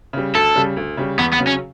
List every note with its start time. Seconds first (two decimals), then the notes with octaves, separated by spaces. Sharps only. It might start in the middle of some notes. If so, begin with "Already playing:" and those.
0.13 C#3 G3
0.35 D2 A4
0.56 C#3 G3
0.77 D2
0.97 C#3 G3
1.18 E2 B3
1.33 B3
1.39 C#3 F#3
1.47 C#4